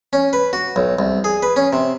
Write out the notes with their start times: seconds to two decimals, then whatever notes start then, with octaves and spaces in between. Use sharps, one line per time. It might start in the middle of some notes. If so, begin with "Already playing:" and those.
0.13 C#4
0.33 B4
0.53 F#4
0.76 B1
0.99 C2
1.24 G#4
1.43 B4
1.56 C#4
1.73 C3